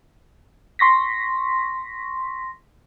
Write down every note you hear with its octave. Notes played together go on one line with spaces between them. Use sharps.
C6 C#6 A#6 B6